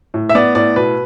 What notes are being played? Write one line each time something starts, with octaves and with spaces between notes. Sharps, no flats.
A2
E5
B3 D5
A2 D5
B2 B4